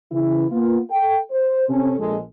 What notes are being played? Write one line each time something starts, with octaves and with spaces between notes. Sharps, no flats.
C#3 E3 E4
A#3 B3 F4
A4 G5
C5
C3 C#4 A4
A#1 G#3 A4